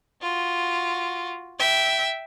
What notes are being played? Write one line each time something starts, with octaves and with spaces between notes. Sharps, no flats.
F4 F#4
E5 G5